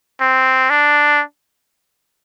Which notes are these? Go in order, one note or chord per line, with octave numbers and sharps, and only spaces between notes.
C4
D4